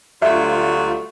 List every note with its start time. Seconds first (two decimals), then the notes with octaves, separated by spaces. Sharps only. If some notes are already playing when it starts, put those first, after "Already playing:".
0.22 D2 F#3 G3 A3 F4 E5